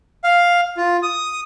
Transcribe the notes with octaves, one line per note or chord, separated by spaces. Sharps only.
F5
F4
D#6